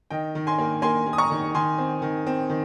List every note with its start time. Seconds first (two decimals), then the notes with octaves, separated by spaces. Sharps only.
0.10 D#3 D#5 G5
0.35 D#3
0.47 G#5 C6
0.58 A#3
0.82 A#3 G#5 C6
1.06 A#3
1.13 D#6
1.18 A#5 C#6
1.31 D#3
1.54 D#3 G#5 C6
1.78 C4
2.02 D#3
2.27 C4
2.50 D#3